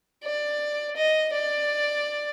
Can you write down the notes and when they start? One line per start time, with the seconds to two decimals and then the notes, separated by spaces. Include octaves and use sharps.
0.23 D5
0.96 D#5
1.33 D5